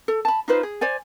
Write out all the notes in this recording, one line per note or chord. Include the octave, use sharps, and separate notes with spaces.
A4
A5 B5
D#4 F4 B4 C5
G#4
C5 D5 G#5